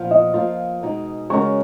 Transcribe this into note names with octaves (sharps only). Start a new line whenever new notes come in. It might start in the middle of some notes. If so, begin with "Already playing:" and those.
Already playing: A#2 F3 B3 F4
D#5
F3 A#3 F4
B2 G#3 D#4
C#3 G#3 C#4 F#4 A#4 C#6